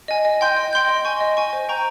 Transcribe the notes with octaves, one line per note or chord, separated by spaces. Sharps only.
D#5 G#5
D#5
G5 C6 G6
D#5
G5 C6 G6
D#5
G#5 C#6
D#5
G#5 C#6
C5
G5 A#5 C#6 G6